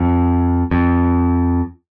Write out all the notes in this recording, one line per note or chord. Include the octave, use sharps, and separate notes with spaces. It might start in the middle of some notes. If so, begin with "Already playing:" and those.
Already playing: F2
F2